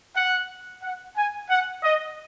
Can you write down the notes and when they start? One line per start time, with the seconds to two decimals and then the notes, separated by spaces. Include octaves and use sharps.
0.16 F#5
0.83 F#5
1.17 G#5
1.50 F#5
1.83 D#5